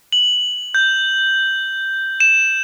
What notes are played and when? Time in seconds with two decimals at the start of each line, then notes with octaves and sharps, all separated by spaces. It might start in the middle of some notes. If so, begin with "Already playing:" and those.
0.12 F#7
0.75 G6
2.20 E7